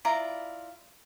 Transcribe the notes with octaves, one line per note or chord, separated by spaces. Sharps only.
E4 F4 D5 A#5